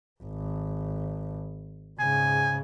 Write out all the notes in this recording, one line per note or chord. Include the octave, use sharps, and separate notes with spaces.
G#1
G#2 C#3 G#5